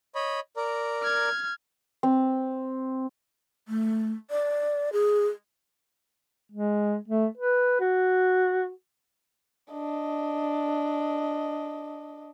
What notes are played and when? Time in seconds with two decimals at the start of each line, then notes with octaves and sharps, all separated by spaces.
0.15 C#5 D#5 B5
0.57 A#4 D5 A#5
1.02 F6 G#6
2.03 C4
3.68 A3
4.30 D5
4.93 G#4
6.52 G#3
7.08 A3
7.37 B4
7.80 F#4
9.72 D4 D#5